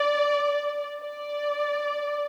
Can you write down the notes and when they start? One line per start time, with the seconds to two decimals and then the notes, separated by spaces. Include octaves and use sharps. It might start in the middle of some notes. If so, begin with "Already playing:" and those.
Already playing: D5
1.01 D5